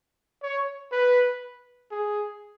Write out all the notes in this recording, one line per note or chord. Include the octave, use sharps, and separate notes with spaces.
C#5
B4
G#4